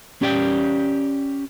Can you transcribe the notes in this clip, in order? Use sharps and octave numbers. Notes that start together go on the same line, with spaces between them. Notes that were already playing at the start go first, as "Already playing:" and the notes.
C#4 G4 D5 G5